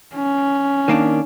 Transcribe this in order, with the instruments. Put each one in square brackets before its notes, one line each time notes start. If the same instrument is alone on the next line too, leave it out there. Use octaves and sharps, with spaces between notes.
[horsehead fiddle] C#4
[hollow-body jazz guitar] D#3 A#3 D4